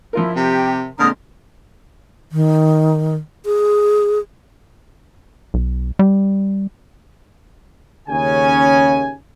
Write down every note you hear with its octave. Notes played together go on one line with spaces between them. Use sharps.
F3 E4 F4 A#4
C3 G4
A#2 D3 G#3 C4 A#5 D#6 F6
D#3
G#4
B1
G3
D#2 C#3 C#4 G#5